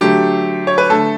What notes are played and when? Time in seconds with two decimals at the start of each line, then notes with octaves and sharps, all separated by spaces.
0.01 D3 F#3 A3 G4
0.67 C#5
0.78 B4
0.89 D3 A3 A4